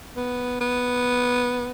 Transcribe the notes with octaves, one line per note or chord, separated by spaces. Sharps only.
B3
B3